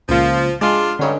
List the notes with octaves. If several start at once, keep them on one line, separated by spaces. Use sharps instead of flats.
C#2 A#2 F3
G#3 D4 F4
G2 D3 C#4 D#4